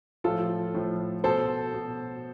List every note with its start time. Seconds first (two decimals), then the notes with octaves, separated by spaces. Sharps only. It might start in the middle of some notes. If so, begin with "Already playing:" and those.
0.24 A2 F3 F4 A4
0.74 A2 F3
1.24 B2 A4 C5
1.74 B2